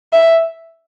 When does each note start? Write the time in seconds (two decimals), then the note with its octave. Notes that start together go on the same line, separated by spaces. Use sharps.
0.13 E5